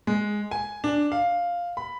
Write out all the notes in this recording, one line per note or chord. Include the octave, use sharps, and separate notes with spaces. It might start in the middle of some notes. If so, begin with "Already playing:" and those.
G#3
G#5
D4
F5
B5